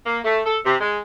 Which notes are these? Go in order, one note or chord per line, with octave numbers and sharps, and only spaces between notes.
A#3
A3
A4
C3
G#3